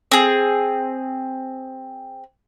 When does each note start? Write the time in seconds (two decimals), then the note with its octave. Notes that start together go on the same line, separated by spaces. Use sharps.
0.12 C4 G#4